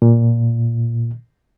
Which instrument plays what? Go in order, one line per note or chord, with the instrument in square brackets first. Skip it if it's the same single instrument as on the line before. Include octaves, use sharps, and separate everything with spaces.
[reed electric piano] A#2